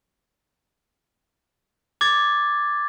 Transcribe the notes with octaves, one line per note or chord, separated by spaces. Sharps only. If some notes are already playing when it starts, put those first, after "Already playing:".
D6 G#6 A6